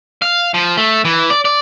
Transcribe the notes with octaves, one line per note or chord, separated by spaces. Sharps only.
F5
F3
A3
E3
D5
D5